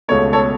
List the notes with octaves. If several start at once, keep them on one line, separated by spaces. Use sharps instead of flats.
C#2 B2 A3 C#5
A4 C#5